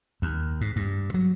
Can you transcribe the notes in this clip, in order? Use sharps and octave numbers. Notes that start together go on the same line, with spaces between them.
D#2
G#2
G2
F#3